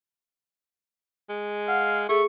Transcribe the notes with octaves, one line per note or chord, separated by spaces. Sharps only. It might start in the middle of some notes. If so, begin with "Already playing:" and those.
G#3
F5 F#5
A3 G#4 C#6